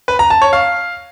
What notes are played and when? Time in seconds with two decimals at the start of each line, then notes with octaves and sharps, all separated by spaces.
0.08 B4
0.19 A#5
0.30 A5
0.42 C#5
0.53 F5